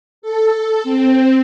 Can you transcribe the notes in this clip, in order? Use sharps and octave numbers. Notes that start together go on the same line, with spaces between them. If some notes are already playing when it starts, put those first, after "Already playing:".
A4
C4